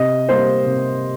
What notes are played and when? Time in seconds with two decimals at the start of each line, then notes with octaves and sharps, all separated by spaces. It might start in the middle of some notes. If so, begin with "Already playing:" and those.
Already playing: C3 D#5
0.29 G3 A#3 C5
0.66 C3